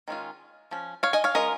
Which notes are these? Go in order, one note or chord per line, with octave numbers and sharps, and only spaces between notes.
D#3 G#3 C#4 F4
F3 C#4
C#5 F5
D#5 G#5
C#5 F5
G#3 C#4 F4 A#4 D#5